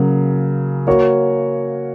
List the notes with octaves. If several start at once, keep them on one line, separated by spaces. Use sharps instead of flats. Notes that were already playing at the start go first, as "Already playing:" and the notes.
Already playing: C#3 F#3 A#3
A#3 F#4 C#5